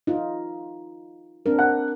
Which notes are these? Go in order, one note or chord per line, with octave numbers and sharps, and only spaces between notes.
D#4 F4
C4 D4 A#4
F#5